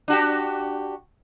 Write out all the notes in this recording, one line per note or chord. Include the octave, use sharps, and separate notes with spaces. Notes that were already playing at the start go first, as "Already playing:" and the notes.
D4 F#4 G4